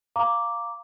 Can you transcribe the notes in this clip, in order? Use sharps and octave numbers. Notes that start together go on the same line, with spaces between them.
F5 A#5 D6